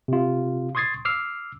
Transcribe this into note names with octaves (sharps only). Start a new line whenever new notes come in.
C3 F4
C6 C#6 D#6 G#6 A6 C7
D6 E6 F6 C7